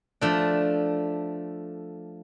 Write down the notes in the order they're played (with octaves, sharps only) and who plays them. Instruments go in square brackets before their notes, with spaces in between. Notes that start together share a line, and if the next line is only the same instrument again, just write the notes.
[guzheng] F3 A3 D4